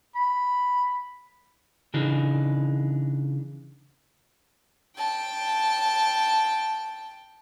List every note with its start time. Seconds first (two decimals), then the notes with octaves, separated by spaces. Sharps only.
0.16 B5
1.94 C#3 E3 D4 D#4
4.97 G5 A5